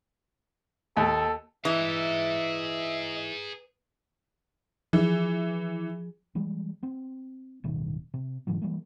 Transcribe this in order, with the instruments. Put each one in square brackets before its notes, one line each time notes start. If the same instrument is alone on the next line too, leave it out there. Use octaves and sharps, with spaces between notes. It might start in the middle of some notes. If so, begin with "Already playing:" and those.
[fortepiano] D#2 [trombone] A4
[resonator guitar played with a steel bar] E3 [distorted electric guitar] G#4 A#5 [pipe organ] D#5 [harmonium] E5
[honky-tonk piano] E3 [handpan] F3 G#4
[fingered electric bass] E3 G3 G#3
B3 C4
D1 G2 B2 D#3
C3
G#2 C#3 E3 F#3
E3 G3 G#3 A#3